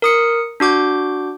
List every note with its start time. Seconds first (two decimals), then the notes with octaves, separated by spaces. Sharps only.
0.02 A#4 D#6 C#7
0.60 D4 F#4 D6 G6